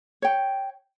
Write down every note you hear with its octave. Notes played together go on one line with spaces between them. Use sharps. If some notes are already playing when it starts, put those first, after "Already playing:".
C#5 G5